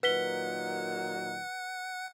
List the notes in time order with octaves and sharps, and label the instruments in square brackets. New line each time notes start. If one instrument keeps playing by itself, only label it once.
[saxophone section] A#2 D#3 F#3 [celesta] B4 B6 G7 [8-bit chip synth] F#5